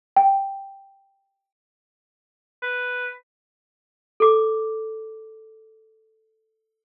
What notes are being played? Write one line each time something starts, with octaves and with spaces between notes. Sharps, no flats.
G5
B4
A4 D6